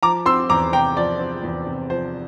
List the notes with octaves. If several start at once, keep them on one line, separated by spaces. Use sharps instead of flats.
F3 A#5 D6
C4 C6 E6
E2 A#5 D6
C3 G5 A#5
F3 D5
C4
E2
C3
F3 C5